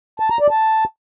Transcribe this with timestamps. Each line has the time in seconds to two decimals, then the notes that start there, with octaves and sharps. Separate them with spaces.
0.20 A5
0.30 A#5
0.40 D5
0.51 A5